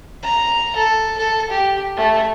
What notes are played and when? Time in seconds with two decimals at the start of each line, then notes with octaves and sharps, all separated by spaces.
0.23 A#5
0.76 A4
1.17 A4
1.50 G4
1.97 A3